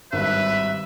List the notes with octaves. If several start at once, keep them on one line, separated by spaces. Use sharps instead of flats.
G#1 G2 B4 E5